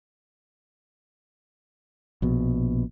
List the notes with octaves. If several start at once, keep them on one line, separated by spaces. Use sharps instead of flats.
A#1 B2